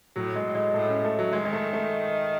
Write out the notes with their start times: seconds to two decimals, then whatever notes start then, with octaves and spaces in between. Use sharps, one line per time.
0.16 A2 F#3
0.36 G#3
0.45 A2
0.55 G#3
0.74 A2 A3
0.89 C#4
1.04 A3
1.19 F#3
1.33 D#3 G#3
1.45 G#3
1.53 A3
1.73 A3